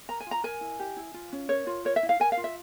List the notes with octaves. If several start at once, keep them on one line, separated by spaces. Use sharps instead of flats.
A#4 A#5
G#5
F4 A#5
A#4 G#5
E4
G4
E4
F4
C#4
A#4 C#5
F4
A#4 C#5
E5
E4
F5
A#4 G#5
F5
F4
E5